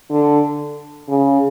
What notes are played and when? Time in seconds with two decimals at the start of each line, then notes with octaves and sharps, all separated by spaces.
0.10 D3
1.09 C#3